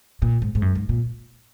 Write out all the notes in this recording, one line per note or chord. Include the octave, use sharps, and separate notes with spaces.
A#2
G#2
G#2
F#2
G#2
A#2